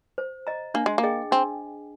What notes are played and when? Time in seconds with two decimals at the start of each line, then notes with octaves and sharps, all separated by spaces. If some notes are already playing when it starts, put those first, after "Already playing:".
0.18 C5
0.47 D#5 A#5
0.74 A#3 D4
0.86 G#3
0.98 A#3
1.03 G#4 D#5 G5
1.31 C4 D4